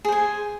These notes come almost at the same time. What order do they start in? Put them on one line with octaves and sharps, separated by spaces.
G#4 C5 G#5